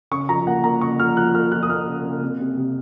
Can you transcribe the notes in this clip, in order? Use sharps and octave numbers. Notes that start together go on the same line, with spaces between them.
C#3 C#6
F3 A#5
A#3 F#5
A#3 A#5
C#3 C#6
F3 F6
F3 F#6
A#3 F6
F3 F#6
D#6
A#3 F6
C#3
C#3
C3
C3
C3